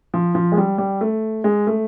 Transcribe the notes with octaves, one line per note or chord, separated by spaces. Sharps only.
F3
F3
G#3
G3
G3
A3
G#3
A3